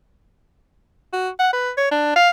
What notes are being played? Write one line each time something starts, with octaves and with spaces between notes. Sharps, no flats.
F#4
F#5
B4
C#5
D4
F5